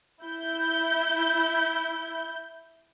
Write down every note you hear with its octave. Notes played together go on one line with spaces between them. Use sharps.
E4 G6